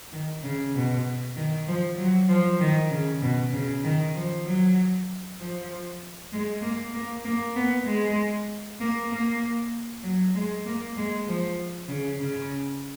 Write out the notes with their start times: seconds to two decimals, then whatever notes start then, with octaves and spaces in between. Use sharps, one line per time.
0.12 D#3
0.43 C#3
0.74 B2
1.36 D#3
1.67 F3
1.97 F#3
2.28 F3
2.60 D#3
2.90 C#3
3.21 B2
3.52 C#3
3.83 D#3
4.15 F3
4.45 F#3
5.38 F3
6.32 G#3
6.61 A#3
6.93 A#3
7.24 A#3
7.55 B3
7.86 G#3
8.79 A#3
9.10 A#3
10.02 F#3
10.33 G#3
10.65 A#3
10.96 G#3
11.26 F3
11.88 C#3
12.19 C#3